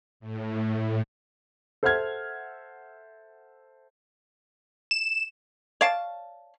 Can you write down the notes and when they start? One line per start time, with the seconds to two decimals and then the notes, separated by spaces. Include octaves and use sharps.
0.20 A2
1.83 A4 C5 E5 F#5 F6 G#6
4.91 E7
5.81 C#5 D5 F5 A5